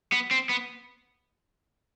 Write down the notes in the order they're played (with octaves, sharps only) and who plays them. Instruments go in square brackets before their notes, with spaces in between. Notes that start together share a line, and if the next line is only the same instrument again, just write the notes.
[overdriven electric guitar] B3
C4
B3